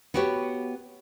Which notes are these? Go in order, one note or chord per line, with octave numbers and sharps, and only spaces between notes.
B3 F#4 G4 B4 C#5